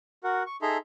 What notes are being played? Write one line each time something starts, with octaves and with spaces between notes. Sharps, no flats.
F#4 A#4 F#5
C#6
D#4 G#4 A4 E5 A#5 C6